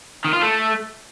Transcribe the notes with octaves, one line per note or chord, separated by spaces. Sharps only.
D#3
F4
A3